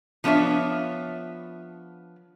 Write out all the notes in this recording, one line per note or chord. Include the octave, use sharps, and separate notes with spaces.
F3 B3 D4 C#5 E5